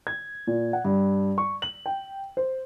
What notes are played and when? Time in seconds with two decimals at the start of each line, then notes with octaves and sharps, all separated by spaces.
0.07 G#6
0.47 A#2
0.73 F#5
0.85 G2
1.38 C#6
1.62 F#7
1.86 G5
2.37 C5